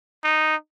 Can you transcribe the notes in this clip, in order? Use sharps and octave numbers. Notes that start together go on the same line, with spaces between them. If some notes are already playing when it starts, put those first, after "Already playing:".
D#4